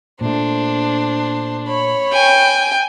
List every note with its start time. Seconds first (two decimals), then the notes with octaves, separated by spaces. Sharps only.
0.21 A#2 A3 D4 C5
1.68 C#5 B5
2.13 G5 G#5